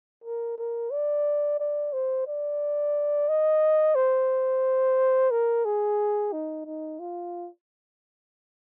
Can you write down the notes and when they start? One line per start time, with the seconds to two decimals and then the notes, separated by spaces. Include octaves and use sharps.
0.24 A#4
0.58 A#4
0.92 D5
1.60 D5
1.93 C5
2.27 D5
3.29 D#5
3.95 C5
5.31 A#4
5.65 G#4
6.33 D#4
6.65 D#4
7.00 F4